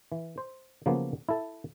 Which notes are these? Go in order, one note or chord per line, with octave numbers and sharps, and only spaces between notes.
E3
C5
C#3 F3 F#3 A#3 B3
E4 A4